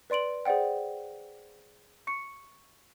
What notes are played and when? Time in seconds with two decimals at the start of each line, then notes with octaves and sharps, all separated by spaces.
0.10 B4 D5 C6 D7 F#7
0.45 G#4 C5 D5 F#5 G5
2.07 C#6 C#7